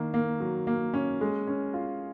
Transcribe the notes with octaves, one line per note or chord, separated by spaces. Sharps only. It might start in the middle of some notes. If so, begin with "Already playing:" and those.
Already playing: D#3 A#3
A#3
F#3
A#3
C#4
G#3
C#4
F4